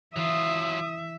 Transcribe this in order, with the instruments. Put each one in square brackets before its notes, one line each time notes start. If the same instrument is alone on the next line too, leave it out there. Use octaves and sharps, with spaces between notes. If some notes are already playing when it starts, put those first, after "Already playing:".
[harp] E3 [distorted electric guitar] F#3 F4 [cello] E5 [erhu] D#6